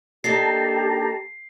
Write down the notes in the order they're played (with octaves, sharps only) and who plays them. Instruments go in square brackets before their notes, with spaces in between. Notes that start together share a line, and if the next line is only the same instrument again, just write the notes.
[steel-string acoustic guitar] A#3 D4 D#4 [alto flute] G4 [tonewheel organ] A4 A5 A#5 [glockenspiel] C7